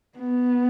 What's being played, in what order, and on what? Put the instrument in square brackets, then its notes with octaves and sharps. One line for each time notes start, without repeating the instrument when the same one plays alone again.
[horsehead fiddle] B3